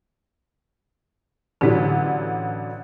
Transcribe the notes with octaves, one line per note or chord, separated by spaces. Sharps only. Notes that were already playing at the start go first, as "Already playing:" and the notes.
A1 D3 F#3 E4 G4